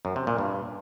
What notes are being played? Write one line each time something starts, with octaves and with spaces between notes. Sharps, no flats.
F#2
C3
A#2
G2